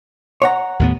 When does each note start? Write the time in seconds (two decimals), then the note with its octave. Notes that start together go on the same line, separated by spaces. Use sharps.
0.42 C#5 F#5 A#5
0.79 D#2 A2 B3